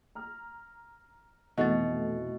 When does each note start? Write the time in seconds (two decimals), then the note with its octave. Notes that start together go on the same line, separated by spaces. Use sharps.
0.15 A#5 F6
1.57 F1 B2 E3 A3 D#5 F#5 A6